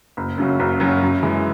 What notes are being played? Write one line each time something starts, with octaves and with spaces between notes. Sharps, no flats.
F#1
F#2 C#3 F#3
F#1
F#2 C#3 F#3
F#2
E3 G#3